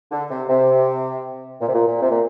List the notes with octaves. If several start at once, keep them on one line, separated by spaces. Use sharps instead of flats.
D3
C3
C3
A#2
C3
A#2
A#2
C3
A#2